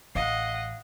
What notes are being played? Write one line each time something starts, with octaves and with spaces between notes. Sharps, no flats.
A1 D#5 F5 F#5